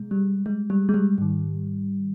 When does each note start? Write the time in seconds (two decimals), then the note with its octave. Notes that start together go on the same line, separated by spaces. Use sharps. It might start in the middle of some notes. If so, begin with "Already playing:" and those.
Already playing: B2 G#3
0.11 G3
0.46 G#3
0.70 G3
0.89 G#3
0.94 G3
1.18 G#2 D#3